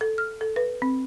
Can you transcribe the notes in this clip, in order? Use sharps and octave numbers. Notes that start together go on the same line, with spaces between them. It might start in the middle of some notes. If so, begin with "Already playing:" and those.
A4
F6
A4
B4
C4